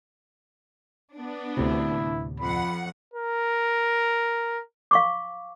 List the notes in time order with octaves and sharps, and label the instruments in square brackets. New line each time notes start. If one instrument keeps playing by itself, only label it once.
[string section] B3 D4
[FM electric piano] D2 A2 C3 [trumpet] E4
[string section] F2 F#5 [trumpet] B5
[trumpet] A#4
[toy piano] F5 C#6 D6